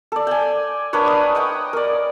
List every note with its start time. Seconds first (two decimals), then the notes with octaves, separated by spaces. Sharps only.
0.12 A4 D5
0.27 G5 G#5
0.93 D4 A#4 B4 C#5
1.07 D#6
1.35 D#5 F#5 G5
1.73 A#4 D5